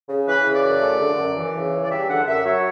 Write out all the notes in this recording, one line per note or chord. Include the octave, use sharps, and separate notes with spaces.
C#3
E3 B4
C#3
D5
F#2
A3
D3
F#2
E3
C#3
C#2
D5
G3 E5
D3 F#5
F#2 E5
F#3 C#5